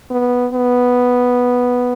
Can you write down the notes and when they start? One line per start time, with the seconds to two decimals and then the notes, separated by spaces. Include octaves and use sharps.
0.11 B3
0.53 B3